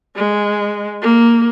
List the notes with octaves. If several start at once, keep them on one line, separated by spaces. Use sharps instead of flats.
G#3
A#3